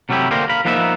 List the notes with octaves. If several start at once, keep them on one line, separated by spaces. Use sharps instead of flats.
C3 F#3 G3 A3 E4 G4
D3 A#3 D4 G4 A#4 C5
A#4 F5 B5
F3 A#3 B3 D#4 D#5 E5